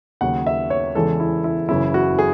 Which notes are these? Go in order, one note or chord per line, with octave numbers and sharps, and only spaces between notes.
D#2 C#3 F#3 F#5
E5
C#5
E2 C#3 E3 G#3 A4
E4
E4
F#1 F#2 C#3 E3 E4
F#4
G#4